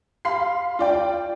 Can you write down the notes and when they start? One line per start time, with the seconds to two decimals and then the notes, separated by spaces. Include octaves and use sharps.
0.25 F5 B5 C6 C7
0.79 F4 D5 G5